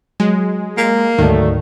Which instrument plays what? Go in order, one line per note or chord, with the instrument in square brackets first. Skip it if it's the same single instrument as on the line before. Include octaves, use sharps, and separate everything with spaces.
[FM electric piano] F#3 [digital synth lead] G#3
[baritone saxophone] A#3
[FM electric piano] D2 G#2 [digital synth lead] D#3 [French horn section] F#3 A3 D5